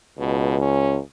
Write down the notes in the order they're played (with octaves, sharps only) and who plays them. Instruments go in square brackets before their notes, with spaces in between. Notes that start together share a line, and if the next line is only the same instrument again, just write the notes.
[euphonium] C#2 [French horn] B2
[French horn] C#4